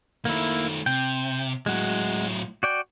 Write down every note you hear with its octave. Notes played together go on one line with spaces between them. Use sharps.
D#3 A3 A#3 E4
C3 G5
A2 F#3 G#3 F#4
F#4 D5 G5